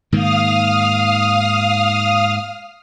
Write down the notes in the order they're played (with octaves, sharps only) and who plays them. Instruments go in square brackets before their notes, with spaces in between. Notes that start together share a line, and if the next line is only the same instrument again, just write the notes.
[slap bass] G#2 D#3 A#3 [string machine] F5 D#6 F6